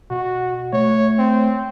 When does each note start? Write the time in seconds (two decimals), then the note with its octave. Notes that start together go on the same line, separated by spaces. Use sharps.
0.10 B2 F#4
0.73 A3 C#5
1.19 C4